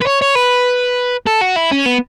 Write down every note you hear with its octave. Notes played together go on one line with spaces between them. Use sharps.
B4
C#5
C#5
B4
A4
F#4
E4
C#4
B3